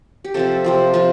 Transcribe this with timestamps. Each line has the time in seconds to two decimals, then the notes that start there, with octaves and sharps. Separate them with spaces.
0.24 G4
0.34 C3 F3 C4 A4
0.64 C3 F3 C4
0.94 F3 C4 F4